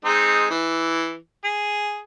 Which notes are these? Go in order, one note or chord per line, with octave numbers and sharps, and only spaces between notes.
G#3 C4 D#4
E3
G#4